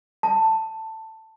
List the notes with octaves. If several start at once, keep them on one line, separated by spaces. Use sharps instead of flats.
A5